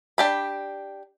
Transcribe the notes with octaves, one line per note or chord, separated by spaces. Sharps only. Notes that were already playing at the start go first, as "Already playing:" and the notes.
D4 G4 B5